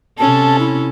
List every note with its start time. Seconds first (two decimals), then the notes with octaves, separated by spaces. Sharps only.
0.19 C3 C#4 A4 A5
0.59 E4